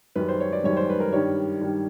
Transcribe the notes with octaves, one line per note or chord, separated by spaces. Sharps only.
F#2 D#3 G3 B4
C5
C#5
D5
F#2 D#3 G3 C#5
C5
B4
A#4
G2 D#3 G3 C#5
G2 D#3 G3